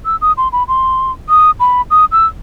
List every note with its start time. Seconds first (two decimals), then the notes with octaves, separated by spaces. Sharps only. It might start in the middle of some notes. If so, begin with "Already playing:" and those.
0.05 E6
0.21 D#6
0.37 C6
0.52 B5
0.68 C6
1.29 D#6
1.60 B5
1.91 D#6
2.12 E6